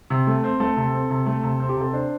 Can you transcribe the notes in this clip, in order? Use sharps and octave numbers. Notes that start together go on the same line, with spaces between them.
C3
A3
C4
A3 A4
C3
C4
C3
A3
C3
C4
G4
C3 A4
D4 C5